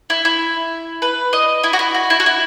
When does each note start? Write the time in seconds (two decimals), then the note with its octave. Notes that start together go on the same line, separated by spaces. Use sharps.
0.10 E4
0.25 E4
1.02 B4
1.33 D#5
1.63 E4
1.73 F#4
1.79 E4
1.95 F#4
2.10 E4
2.20 F#4
2.26 E4